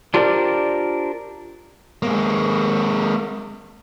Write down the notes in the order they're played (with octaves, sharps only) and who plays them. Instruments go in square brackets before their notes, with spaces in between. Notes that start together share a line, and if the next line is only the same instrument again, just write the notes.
[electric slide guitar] D4 F4 G4 A#4 C5 D5
[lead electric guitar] G#3 A#3